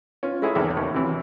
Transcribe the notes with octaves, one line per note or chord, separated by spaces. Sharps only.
C#4 F4
G#3 A3 E4 G#4 C#5
G#1 E2 E5
D#2 C#6
C3 E3 F#3